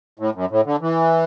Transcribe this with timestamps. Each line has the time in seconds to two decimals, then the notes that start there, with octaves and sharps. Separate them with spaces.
0.19 A2
0.35 F#2
0.50 A2
0.66 D3
0.81 E3